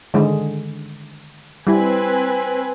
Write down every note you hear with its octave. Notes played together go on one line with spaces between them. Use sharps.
D3 D#3 G#3
G3 C4 E4 B4 G#5